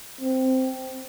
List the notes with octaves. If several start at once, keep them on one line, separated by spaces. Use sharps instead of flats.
C4